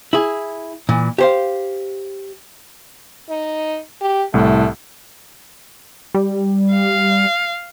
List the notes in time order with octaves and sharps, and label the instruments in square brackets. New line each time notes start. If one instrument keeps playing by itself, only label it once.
[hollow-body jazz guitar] E4 G#4
A#2 E3
G4 C5 F5
[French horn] D#4
G4
[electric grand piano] C2 A2 [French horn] A3
[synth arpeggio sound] G3
[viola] F5